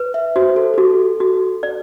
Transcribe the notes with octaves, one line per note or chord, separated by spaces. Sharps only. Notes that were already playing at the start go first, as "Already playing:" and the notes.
Already playing: B4
E5
F#4 C5
A4
G4
F#4 A4
F#4
D5